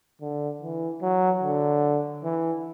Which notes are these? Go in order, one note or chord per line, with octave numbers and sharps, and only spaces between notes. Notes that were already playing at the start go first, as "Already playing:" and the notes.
D3
E3
F#3
D3
E3